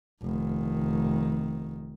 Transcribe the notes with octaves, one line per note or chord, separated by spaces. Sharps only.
F1 D#3